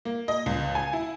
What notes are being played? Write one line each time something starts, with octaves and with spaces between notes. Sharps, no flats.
A#3
D#5
C#2
G#5
E4